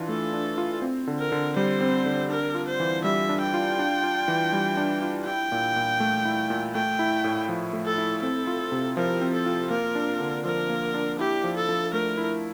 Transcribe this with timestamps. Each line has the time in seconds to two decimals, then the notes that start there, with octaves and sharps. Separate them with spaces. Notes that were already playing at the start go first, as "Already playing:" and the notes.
Already playing: E3 D4 F4
0.08 A3 A4
0.33 D4
0.58 F4
0.82 C4
1.07 D3
1.19 A#4
1.32 D3
1.56 G3 C5
1.81 C4
2.06 D3
2.30 D4 A#4
2.55 F4
2.67 C5
2.80 E3
3.04 G3 E5
3.29 D4
3.41 G5
3.54 F4
3.79 D4
4.03 F4
4.28 E3
4.53 G3
4.77 D4
5.02 F4
5.26 E4 G5
5.52 A#2
5.76 A#2
6.00 A3
6.25 E4
6.50 A#2
6.74 A3 G5
6.99 E4
7.24 A2
7.49 F3
7.73 A3
7.86 A4
7.98 E4
8.22 C4 A4
8.47 F4
8.72 C3
8.97 F3 A#4
9.21 C4
9.34 A4
9.46 F4
9.71 A#3 A#4
9.95 D4
10.20 D3
10.45 F3 A#4
10.70 A#3
10.94 D4
11.19 E4 G4
11.44 F3
11.56 A4
11.69 F3
11.93 A3 A#4
12.18 E4